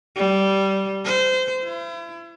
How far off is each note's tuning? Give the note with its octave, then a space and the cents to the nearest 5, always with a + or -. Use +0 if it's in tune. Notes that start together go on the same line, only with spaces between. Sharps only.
G3 -15
C5 -25
E4 +40